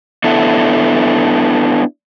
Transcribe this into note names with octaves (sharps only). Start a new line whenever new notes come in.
B3 D4 E4 A4